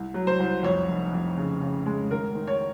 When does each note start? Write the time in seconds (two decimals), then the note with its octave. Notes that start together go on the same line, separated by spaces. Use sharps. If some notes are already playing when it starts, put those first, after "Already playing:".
Already playing: C2
0.14 F#3
0.27 C5
0.40 C2
0.63 F2 C#5
0.88 F1
1.13 F2
1.37 C#3
1.61 C#3
1.86 G#3
2.11 G#1 A#4
2.35 D#3
2.47 C#5